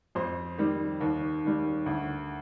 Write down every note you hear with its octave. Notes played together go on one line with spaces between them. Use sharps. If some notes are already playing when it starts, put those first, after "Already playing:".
F2 C5
D#3 G3
D#2
D#3 G3
D2